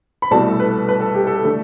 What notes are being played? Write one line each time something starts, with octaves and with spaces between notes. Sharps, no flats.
B5
C2 B2 A3 A5
A4
B4
B4
A4
G4
A4
D3 A3